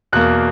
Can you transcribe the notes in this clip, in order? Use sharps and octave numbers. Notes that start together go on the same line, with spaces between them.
E2 B2 A#3 F#6